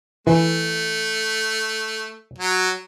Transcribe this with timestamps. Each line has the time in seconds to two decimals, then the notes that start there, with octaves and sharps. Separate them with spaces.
0.27 E3 A3
2.38 F#3